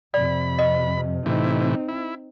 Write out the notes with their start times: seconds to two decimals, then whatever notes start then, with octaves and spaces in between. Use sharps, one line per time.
0.14 F2 C3 D5 B5
0.59 D#5
1.26 A2 C3 E3 C4 D#4
1.89 E4